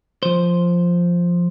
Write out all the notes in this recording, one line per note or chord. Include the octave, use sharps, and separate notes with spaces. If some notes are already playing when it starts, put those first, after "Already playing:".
F3 C5